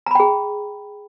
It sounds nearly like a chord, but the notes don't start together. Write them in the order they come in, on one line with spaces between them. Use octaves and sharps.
A#5 B5 G5 G#4